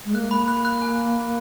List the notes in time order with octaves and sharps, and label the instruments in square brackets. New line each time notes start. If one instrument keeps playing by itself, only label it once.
[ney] G#3
[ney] A#3 [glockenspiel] F#6
[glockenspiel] B5
F#6
F#6
G#5